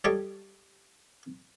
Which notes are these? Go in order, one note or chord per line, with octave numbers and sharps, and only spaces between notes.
G3 G4 A4 C#5 D#5 G5